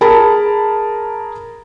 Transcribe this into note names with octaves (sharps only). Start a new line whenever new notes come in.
G#4 A#4 A5 B5